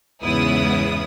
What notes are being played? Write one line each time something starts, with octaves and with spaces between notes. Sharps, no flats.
E2 G#2 C#3 B3 E4 D#6